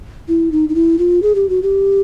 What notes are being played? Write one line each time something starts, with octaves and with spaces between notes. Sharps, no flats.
E4
D#4
D#4
E4
F4
G#4
G4
F#4
G4